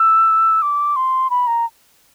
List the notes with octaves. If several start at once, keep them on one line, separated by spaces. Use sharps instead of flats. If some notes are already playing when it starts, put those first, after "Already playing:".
Already playing: E6
D6
C6
B5
A#5